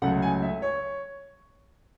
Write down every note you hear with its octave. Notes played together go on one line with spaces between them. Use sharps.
C#2 C#3 F#3 A3 F#5
G#5
E5
C#5